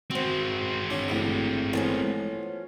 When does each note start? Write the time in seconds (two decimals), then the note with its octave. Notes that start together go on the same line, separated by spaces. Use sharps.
0.11 G#3 C4 F#4 C5
0.90 C#4 D4
1.08 A1 D2 G3
1.73 A1 F3 B3 C#4